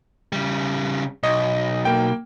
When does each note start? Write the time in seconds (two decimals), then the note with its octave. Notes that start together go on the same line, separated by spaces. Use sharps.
0.32 C#3 G3
1.23 B1 D#5
1.85 A#3 G5